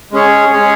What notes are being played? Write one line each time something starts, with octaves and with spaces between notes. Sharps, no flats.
G#3 C#4 G#4 C#5
G#3 C#4 G#4 C#5